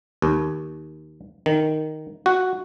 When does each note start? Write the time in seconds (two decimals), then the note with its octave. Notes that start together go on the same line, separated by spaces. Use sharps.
0.22 D#2
1.46 D#3
2.26 F#4